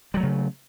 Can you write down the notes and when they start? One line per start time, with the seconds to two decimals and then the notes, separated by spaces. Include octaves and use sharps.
0.14 G3
0.17 F#3
0.20 A3
0.23 C#3